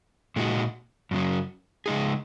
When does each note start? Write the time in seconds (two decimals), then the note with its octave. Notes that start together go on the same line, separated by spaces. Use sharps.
0.36 A#2 G#3 D#4 F#4
1.11 F#2 C#3 F#3
1.86 C#3 G#3 D#4 G#4